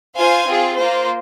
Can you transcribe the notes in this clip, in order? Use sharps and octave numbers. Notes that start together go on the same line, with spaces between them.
F4 C5 F5 G#5
C4 F4 G#4
A#3 F4 C5